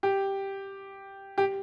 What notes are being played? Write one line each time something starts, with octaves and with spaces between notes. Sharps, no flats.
G4
G4